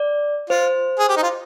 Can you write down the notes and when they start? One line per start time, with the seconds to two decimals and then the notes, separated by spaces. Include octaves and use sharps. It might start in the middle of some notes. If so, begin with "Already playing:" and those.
Already playing: D5
0.50 F4 C5
0.99 G#4
1.09 G4
1.17 D#4
1.23 F4